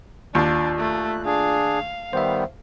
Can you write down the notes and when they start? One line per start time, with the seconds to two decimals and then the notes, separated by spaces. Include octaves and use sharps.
0.35 D#2 D4 F4
0.78 A3 F#6
1.25 D4 G#4 F5
2.13 D#3 G3 B3 C5 E5